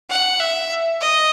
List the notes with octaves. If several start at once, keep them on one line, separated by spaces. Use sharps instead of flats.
F#5
E5
D#5